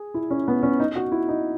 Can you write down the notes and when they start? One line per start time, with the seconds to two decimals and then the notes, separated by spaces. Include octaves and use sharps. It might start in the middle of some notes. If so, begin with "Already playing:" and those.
Already playing: G#4
0.14 E4
0.30 C#4
0.48 B3
0.63 C#4
0.80 D#4
0.95 F#4
1.12 E4
1.28 D#4